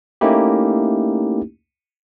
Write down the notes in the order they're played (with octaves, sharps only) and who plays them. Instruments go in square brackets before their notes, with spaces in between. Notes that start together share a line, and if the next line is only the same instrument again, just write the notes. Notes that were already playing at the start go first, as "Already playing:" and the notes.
[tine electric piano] A3 A#3 C#4 D#4 E4 G4